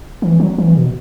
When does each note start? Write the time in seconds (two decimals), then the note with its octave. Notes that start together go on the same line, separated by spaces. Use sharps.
0.22 E3
0.40 F#3
0.58 E3
0.75 B2